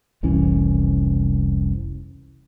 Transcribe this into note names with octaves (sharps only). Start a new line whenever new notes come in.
F1 C2 E3 C#4